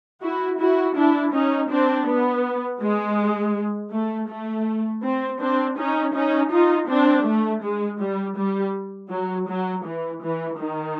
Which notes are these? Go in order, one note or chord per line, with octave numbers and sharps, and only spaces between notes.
E4 F#4
E4 F#4
D4 E4
C#4 D#4
C4 D4
B3
G#3
A3
A3
C4
C4 D4
C#4 D#4
C#4 D#4
D#4 F4
C4 D4
A3
G#3
G3
G3
F#3
F#3
E3
E3
D#3